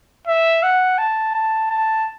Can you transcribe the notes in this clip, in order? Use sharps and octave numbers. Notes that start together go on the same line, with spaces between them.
E5
F#5
A5
A5
A5